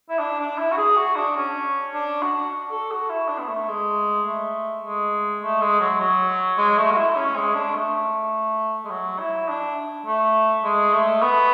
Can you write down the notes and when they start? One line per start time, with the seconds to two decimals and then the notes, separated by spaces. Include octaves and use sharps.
0.10 E4
0.19 D4
0.39 D4
0.58 E4
0.72 F#4
0.77 G#4
0.96 F#4
1.16 D4
1.36 C#4
1.94 D4
2.23 F#4
2.71 A4
2.91 F#4
3.10 E4
3.28 D4
3.39 B3
3.48 A3
3.68 G#3
4.26 A3
4.83 G#3
5.42 A3
5.61 G#3
5.80 F#3
6.00 F#3
6.58 G#3
6.77 A3
6.91 F#4
6.97 E4
7.16 C#4
7.36 G#3
7.54 D4
7.74 A3
8.85 G#3
8.90 F#3
9.19 E4
9.49 D4
10.06 A3
10.64 G#3
10.93 A3
11.22 B3